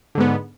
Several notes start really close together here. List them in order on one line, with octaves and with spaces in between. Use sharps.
D3 G#2 B3